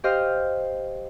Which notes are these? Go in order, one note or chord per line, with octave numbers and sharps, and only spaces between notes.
G4 C5 D#5 F5 F6